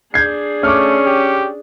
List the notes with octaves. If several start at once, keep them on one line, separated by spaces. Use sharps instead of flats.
D4 G#4 G6 G#6 C7
A3 C#4 D6 F6
G4